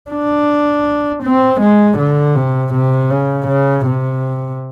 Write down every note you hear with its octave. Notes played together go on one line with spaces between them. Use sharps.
D4
C4
G#3
D3
C3
C3
C#3
C#3
C3